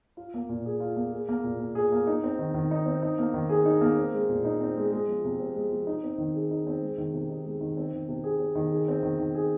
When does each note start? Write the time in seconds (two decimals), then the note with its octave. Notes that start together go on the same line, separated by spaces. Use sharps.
0.17 F4
0.34 A#3
0.49 A#2
0.65 G#4
0.80 F4
0.96 A#3
1.12 G#4
1.29 A#3
1.44 A#2
1.59 A#2
1.75 G#4
1.92 A#3
2.07 D#4
2.24 C4
2.39 D#3
2.54 D#3
2.71 D#4
2.86 C4
3.02 D#4
3.18 A#3
3.34 D#3
3.49 G#4
3.65 D#4
3.81 A#3
3.97 C4
4.13 G#3
4.29 A#2
4.44 D#4
4.61 C4
4.77 G#3
4.92 G#3
5.08 F3
5.24 C3
5.40 C4
5.55 G#3
5.71 F3
5.87 D#4
6.03 C4
6.18 D#3
6.34 G#4
6.51 D#4
6.67 C4
6.82 G#3
6.98 D#3
7.13 C3
7.29 D#4
7.46 G#3
7.61 D#3
7.77 C4
7.93 D#3
8.08 C3
8.24 G#4
8.40 C4
8.55 D#3
8.72 G#4
8.88 C4
9.03 D#3
9.19 D#3
9.35 G#4